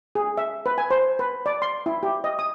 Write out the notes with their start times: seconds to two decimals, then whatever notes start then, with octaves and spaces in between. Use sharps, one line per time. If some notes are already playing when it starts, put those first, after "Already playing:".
0.15 G#4
0.38 E5
0.66 B4
0.78 G#5
0.91 C5
1.19 B4
1.46 D5
1.62 C6
1.86 E4
2.03 G4
2.24 D#5
2.39 D#6